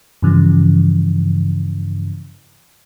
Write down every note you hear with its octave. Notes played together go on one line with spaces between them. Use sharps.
G2 C#3 E3 F3